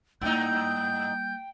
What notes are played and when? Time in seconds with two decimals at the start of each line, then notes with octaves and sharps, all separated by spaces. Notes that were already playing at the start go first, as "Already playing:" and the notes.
0.21 G#2 G3 A#3 D#4 G5 G6